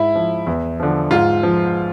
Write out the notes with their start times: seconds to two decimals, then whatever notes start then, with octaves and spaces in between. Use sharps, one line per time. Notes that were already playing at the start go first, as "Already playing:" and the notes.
Already playing: G#2 E4
0.15 F3
0.47 E2
0.80 D3 F3
1.11 G#2 F4
1.43 F3